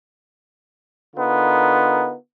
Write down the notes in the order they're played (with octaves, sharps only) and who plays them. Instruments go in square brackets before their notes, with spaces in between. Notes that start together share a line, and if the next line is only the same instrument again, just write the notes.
[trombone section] D3 B3 D#4 F4 A#4